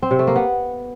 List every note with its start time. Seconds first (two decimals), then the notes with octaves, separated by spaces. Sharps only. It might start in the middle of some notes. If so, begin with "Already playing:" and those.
0.02 C4
0.11 C3
0.19 A3
0.27 A#3
0.36 B3